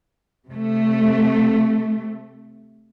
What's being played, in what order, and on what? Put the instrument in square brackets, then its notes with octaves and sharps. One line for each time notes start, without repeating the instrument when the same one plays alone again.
[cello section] C3 A3